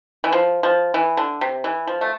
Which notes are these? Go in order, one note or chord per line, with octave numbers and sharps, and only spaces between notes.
E3
F3
F3
E3
D3
C3
E3
F3
A3